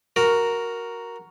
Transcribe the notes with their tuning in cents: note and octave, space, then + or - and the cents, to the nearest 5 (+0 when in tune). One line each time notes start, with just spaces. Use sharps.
F#4 +5 A#4 +0